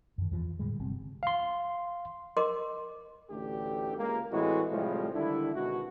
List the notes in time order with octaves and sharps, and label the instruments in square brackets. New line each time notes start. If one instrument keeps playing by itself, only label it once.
[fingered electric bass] F#2 D#3
E2 E3 F3
A2 D3 G3 G#3
G1 C3 G3 C4
[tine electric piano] F5 C6
[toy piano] A#4 D#5 C6 D6
[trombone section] A1 D2 D3 A3 G4
C#2 A#3
A2 E3 G#3 A3 C4 F#4
A2 C3 F3 G3 G#3
D3 D#3 G3 D4 E4
G#1 B2 G#3 F#4